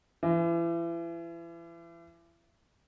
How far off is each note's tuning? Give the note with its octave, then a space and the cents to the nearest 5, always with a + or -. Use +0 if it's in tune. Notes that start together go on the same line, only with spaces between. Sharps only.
E3 +35